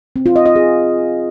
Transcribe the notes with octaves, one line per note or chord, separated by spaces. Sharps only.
C4
F4
D#5
D#5
G#4